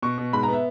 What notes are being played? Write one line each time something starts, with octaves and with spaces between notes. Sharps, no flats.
B2 C#6
B2
G#2 B5
A#5
B3 E5